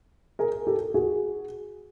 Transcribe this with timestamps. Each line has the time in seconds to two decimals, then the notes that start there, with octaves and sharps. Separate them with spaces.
0.39 G#4 A#4
0.67 G4 A4
0.94 F#4 G#4